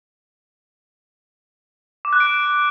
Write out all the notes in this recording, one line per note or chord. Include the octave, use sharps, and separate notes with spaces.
D6
F#6
D7